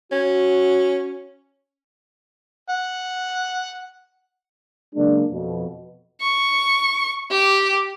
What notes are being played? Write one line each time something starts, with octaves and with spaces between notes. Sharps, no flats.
C#4 F#4
F#5
C#3 F#3 G#3 A#3 D4
F2 B2
C#6
G4